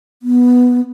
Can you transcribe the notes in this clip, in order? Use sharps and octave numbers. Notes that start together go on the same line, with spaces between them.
B3